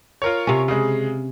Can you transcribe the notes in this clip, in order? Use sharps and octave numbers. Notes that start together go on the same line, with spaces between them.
F4 A#4 C#5
C3 C#4
C#3 G#3